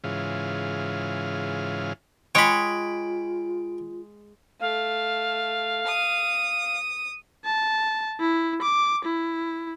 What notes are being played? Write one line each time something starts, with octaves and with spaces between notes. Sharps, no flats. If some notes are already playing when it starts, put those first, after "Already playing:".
G#2 C#3 E3 F4
G#3 F4 C#5 G5 B5
A3 F5
D#6
A5
E4
D6
E4